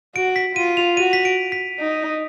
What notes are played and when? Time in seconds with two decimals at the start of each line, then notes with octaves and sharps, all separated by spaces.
0.15 F#4 D7
0.36 B6
0.56 F4 D#7
0.77 F7
0.97 F#4 D#7
1.13 B6
1.25 D7
1.52 B6
1.79 D#4